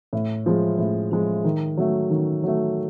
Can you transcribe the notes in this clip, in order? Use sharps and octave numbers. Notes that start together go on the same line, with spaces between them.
A2
F3 G#3
A2
F3 G#3
D#3
F#3 A3
D#3
F#3 A3